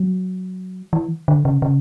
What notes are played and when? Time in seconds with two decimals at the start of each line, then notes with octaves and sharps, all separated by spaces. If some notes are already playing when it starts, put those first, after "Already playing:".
Already playing: F#3
0.93 E3
1.28 D3
1.45 C#3
1.62 C#3